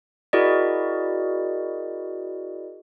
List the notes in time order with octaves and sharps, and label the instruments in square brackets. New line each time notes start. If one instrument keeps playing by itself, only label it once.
[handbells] E4 F#4 G#4 A#4 D5 D#5